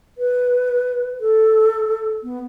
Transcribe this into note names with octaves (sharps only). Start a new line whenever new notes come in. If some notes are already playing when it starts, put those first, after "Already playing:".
B4
A4
B3